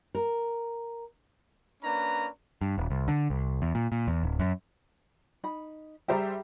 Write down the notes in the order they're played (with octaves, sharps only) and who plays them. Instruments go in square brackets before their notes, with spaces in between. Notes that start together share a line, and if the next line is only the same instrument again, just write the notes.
[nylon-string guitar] A#4
[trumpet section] A#3 C#4 D4 B4 A#5
[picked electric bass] G2
D#1
C2
D3
C2
E2
A#2
A#2
E2
D1
F#2
[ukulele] D#4 B5
[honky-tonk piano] G3 C5 E5 [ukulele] G4 G#4 A#5